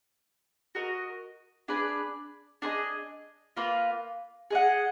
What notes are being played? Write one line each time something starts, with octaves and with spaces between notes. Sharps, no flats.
F#4 A#4 D#5
D4 G#4 B4 D5
D4 G#4 B4 D#5
A#3 F4 B4
G#4 D#5 F#5